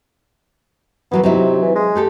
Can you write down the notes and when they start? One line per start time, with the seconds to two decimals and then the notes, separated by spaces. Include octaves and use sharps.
1.12 E3 F#3 A#3 B3
1.23 C3 F#3 D#4 E4
1.62 E3
1.75 G#3
1.95 A3 G4 A4